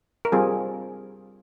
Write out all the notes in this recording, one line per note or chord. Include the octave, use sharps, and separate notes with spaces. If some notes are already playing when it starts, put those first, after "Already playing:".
A#4
G3 C4 F4 G#4